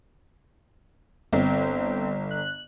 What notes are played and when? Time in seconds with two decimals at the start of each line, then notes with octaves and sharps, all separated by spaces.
1.33 G1 C4
2.31 F#6